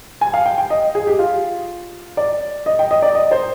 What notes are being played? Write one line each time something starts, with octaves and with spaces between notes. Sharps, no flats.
G#5
F5
G5
G5
D#5
G#4
G4
F4
D5
D#5
G5
D#5
D5
D#5
C5